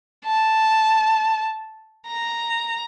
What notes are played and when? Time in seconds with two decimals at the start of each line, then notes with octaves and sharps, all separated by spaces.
0.25 A5
2.08 A#5